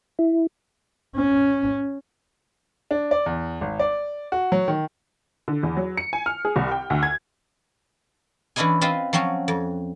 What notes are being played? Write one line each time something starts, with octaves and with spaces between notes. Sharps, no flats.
E4
C#4
D4
D5
E2
G#1
D5
F#4
F#3
D#3
D3
E2
F#3
C#7
G#5
F6
G#4
C2
G5
D2
G#6
E3 C#4 D4 E4 D#5 G#5
C4 F4 B4 C5 D#5 G5
F3 F#3 C4 C#4 F#4
F2